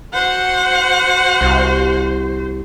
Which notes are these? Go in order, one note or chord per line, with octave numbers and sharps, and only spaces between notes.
F#4 C5 F#5
C2